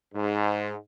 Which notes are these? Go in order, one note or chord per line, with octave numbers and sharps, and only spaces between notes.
G#2